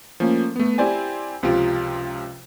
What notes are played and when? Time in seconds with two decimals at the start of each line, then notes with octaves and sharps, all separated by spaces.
0.20 F3 A3 A#3 C#4
0.56 A3 B3
0.78 C4 E4 G4 C5 D5 G#5
1.43 C#2 C3 F3 F4 D7